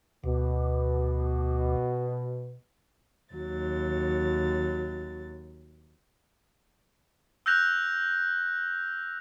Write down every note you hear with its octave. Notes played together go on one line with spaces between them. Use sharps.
D2 B2
D#2 F#3 A6
E6 F#6 G6 A#6 F7